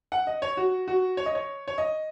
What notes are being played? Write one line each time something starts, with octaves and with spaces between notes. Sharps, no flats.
F#5
D#5
C#5
F#4
F#4
C#5
D#5
C#5
C#5
D#5